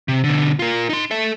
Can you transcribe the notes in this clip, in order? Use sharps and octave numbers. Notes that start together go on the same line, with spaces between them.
C3
B2 D3
F4 A#4
D#4 C6
A4 E5